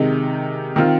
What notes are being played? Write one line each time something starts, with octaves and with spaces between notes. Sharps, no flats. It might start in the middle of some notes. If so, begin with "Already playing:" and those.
Already playing: C3 D#3 G#3 D#4
D#3 C4 F4